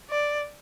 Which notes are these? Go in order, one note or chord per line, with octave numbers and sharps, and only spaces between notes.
D5